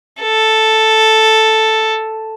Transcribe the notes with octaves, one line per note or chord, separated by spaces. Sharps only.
A4